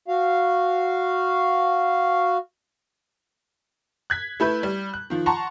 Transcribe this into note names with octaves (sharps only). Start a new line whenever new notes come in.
F#4 F5
F#6 G#6 B6
A3 E4 B4 G6
G3
F#6
D#3 F3
F#5 A5 A#5 C6 C#6